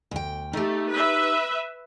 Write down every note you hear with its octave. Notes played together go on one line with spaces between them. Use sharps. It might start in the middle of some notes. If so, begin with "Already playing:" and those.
D2 G5
A3 D#4 G4
B4 E5